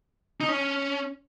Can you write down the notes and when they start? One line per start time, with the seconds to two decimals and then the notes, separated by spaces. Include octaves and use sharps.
0.41 D#4
0.49 C#4